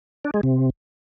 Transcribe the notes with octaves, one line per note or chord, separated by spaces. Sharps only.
D4
G#3
C3